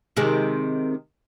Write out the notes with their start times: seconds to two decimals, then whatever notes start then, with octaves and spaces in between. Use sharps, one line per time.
0.17 C3 D#3 G#3